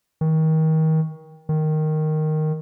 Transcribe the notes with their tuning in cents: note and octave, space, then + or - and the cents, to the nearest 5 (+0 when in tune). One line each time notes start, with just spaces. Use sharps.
D#3 +30
D#3 -5